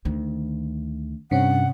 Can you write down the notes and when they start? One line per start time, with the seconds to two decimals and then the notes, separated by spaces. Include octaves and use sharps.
0.05 D2 D#3
1.31 G2 C3 C#4 F#5